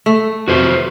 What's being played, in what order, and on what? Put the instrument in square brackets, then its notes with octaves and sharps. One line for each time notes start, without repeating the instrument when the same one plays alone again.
[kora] A3
[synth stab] F2 C3 F3 [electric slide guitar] F#4 B4 C5